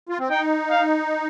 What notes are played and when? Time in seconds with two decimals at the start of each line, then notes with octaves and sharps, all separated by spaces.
0.09 F4
0.20 C4
0.29 D#4 G5
0.70 F5